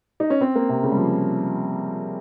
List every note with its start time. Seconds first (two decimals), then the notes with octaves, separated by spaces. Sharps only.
0.20 D#4
0.30 C#4
0.41 C4
0.55 A#3
0.69 C3
0.83 C#3
0.92 G3
0.96 F3